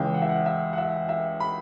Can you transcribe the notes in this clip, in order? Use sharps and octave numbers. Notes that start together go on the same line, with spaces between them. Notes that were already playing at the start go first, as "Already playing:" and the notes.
Already playing: C#2 C#3 E3 G5
F#5
E5
F#5
E5
F#5
E5
E5
B5